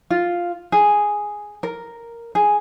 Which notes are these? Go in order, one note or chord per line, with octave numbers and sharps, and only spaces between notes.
F4
G#4
A#4
G#4